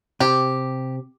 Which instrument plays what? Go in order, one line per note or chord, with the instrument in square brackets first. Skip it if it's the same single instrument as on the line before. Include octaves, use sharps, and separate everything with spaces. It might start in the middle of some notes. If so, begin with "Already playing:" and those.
[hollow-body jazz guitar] C3 [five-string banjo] G4